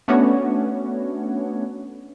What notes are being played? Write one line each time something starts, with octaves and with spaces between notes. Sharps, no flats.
A3 B3 C#4 D4 F#4 C#5